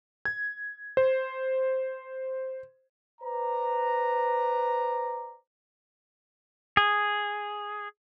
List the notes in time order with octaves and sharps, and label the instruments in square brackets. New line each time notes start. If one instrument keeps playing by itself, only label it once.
[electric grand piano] G#6
C5
[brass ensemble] B4 C5 D5 A#5
[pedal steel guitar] G#4